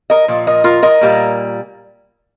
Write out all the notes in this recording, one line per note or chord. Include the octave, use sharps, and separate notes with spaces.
A#4 D#5
A#2 F3
A#4 D#5
F4 A#4
A#4 D#5
A#2 G3 A#3